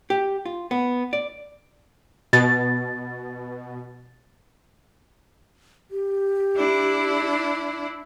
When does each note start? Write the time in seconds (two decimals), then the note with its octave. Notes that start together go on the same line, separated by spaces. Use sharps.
0.10 G4
0.46 F4
0.71 B3
1.13 D5
2.33 B2 A6
5.91 G4
6.57 D4 E4